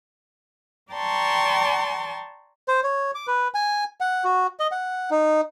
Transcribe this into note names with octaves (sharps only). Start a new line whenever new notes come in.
D5 G5 A5 A#5 C6 C#6
C5
C#5
D6
B4
G#5
F#5
F#4
D#5
F#5
D#4